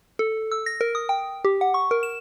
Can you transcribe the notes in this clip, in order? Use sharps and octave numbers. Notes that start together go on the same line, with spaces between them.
A4
E6
A#6
A#4
D#6
G5
G4
F#5
C#6
A#4
E7